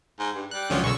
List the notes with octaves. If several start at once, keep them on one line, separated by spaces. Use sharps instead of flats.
G#2
G2
G3 F#6
C#2 D3 F3 F#3 C#4 F4
B1 B2 G#3 A#5 C#6 E6